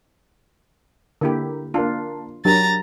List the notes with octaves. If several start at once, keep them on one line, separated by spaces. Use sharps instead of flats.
D3 A#3 E4 G4
A#3 D4 F4 A5
F#3 D4 G4 A#4 A#5 A6